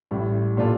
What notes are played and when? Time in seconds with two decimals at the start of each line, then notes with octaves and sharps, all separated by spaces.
0.11 A1 A2 G3
0.57 A#2 G3 D4 F4 A4